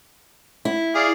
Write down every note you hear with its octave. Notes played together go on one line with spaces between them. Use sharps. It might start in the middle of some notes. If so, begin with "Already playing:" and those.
E4
G#4 D5 F5